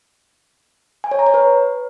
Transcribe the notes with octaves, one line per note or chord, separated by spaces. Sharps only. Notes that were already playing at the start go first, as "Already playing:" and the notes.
G#5
C#5
A#5
C#5
B4